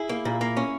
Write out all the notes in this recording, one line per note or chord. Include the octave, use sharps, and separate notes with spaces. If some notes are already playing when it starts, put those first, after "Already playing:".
Already playing: E4 G#4
A#3
A#2
A#3
C#4